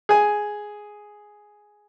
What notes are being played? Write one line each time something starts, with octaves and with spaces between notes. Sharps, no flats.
G#4 G#5